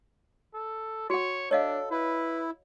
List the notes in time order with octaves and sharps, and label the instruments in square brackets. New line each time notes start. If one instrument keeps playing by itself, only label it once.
[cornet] A4
[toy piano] F#4 F#5 [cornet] C#5
[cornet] D4 [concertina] A4 [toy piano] C#5 D#5 F5
[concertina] E4 [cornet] B4